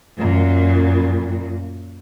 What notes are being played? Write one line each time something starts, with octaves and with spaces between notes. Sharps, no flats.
F#2 A#2